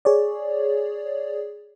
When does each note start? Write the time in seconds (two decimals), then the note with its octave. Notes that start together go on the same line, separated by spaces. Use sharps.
0.05 G#4 C#5 D5